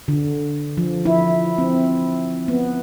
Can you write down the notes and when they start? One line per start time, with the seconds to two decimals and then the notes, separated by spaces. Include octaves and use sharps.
0.08 D3
0.77 F3
1.06 E4
1.58 C4
2.48 B3